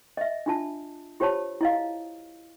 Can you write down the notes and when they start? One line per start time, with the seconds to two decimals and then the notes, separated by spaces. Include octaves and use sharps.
0.17 D#5 E5
0.46 D4 F4 A5
1.20 F4 G4 C5 C#5 A5 B5
1.61 E4 D#5 F5